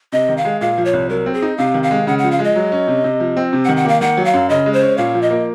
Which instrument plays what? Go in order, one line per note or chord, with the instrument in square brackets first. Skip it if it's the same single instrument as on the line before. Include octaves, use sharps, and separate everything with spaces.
[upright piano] C3 [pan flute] D#5
[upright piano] D#3
[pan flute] F5
[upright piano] G#3
[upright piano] A#2 [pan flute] F5
[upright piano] F3
[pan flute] C#5
[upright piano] C2
[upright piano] F#3 [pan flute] A#4
[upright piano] C4
[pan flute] G#4
[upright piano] D#4
[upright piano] C3 [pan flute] F5
[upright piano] D#3
[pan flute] F5
[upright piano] G#3
[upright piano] C#3 [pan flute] F#5
[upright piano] F3 [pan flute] F#5
[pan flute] F5
[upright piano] G#3 [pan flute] D#5
[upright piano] F#3
C#4
C3
C3
F3
C4
C3
[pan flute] F#5
[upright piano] D#3
[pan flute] F#5
[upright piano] A#3 [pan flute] F5
[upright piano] D#3 [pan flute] F#5
[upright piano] F#3
[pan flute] F5
[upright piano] F#2
[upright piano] C#3 [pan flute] D#5
[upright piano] G#3
[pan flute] C5
[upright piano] C#4
[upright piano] A#2 [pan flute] F5
[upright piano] F3
[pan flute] D#5
[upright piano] A#3